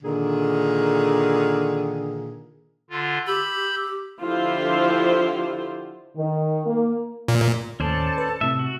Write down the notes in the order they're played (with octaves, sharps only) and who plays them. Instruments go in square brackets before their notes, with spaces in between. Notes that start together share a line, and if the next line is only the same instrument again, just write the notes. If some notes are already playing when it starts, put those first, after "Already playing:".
[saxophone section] A#2 D3 D#3 G#4
[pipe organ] D3 F4
[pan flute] G4 [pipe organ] B5 E6 G6
[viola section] D3 F3 E4 F4 G4 C5
[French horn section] D#3
A#3
[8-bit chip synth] A#2
[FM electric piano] D#2 A2 [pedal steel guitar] C#4 C5 D5 [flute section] A4 A5
[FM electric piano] B4
[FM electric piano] A2 C3 [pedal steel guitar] E5
[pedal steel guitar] F#4